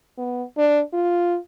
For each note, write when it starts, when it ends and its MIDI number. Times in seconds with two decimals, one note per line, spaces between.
0.18 0.43 59
0.58 0.81 62
0.93 1.38 65